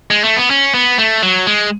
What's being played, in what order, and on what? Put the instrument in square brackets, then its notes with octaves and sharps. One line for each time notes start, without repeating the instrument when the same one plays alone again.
[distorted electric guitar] G#3
A3
B3
C#4
B3
A3
F#3
G#3